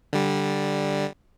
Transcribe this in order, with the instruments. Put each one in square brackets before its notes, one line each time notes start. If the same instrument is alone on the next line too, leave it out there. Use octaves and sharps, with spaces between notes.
[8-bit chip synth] D3 G3